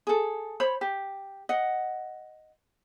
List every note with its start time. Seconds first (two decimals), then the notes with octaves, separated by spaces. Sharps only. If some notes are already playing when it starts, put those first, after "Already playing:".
0.07 G#4 A4
0.60 C5 C#5 B5
0.81 G4
1.49 D#5 F#5